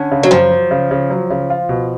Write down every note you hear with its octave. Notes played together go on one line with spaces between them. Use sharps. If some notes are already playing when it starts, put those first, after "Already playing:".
Already playing: D3 C#4
C#3
F#3
F#2 F3
F#3
C#3
C#3
F#3
C#3
F4
B2